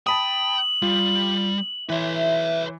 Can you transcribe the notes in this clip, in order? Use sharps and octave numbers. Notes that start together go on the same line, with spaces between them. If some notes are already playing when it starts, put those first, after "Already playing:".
G5 A5 B5 D#6 F#7
G3 F4
E3 B4 C#5 E5